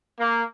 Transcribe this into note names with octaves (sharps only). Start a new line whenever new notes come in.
A#3